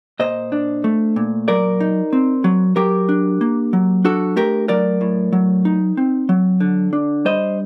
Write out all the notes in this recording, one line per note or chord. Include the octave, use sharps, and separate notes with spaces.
A#2 C5 D#5
D4
A3
A#2
F#3 A#4 D5
D#4
C4
F#3
F#3 G4 A#4
D4
A#3
F#3
D4 F#4 A4
A3 G4 A#4
F#3 A#4 D5
A2
F#3
D#4
C4
F#3
D3
D4
G3 C5 D#5